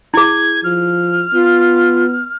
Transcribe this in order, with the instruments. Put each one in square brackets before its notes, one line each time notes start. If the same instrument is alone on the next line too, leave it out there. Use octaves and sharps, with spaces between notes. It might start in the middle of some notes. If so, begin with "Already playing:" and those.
[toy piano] E4 G#4 [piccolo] G#6
[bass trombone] F3 [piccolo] F6
[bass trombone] B3 [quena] F4